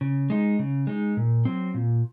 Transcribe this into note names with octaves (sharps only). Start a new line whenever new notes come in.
C#3
G#3 D#4
C#3
G#3 D#4
A#2
F#3 C4
A#2